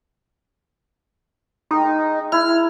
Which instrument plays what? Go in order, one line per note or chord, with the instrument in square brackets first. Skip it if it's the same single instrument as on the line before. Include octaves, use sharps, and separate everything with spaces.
[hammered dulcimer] G#3 A#4 G5 [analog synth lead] D#4
[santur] E4 [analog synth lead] F6